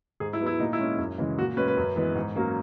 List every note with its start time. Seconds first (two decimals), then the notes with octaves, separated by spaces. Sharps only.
0.20 G#2 G#4
0.33 E4
0.40 F#3 B3
0.46 E4
0.59 A#2 D#4
0.73 E4
0.79 G#3 C#4
0.98 F#2
1.18 C#3 E3 G#3
1.38 A#2 F#4
1.57 G#3 C#4 B4
1.68 B4
1.77 F#2
1.96 E3 G#3 B3
2.16 G#2
2.36 F#3 A#3 C#4